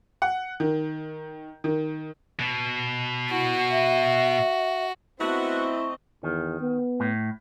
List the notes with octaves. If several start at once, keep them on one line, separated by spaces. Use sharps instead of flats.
F#5
D#3
D#3
B2
E4 F#4
E5
A3 B3 C4 E4 F#4 D#5
E2 D#3
B3
A2